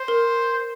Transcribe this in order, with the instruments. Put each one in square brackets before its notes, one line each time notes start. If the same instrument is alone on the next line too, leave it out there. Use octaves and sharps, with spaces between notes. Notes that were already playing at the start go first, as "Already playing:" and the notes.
Already playing: [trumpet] C5
[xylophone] A#4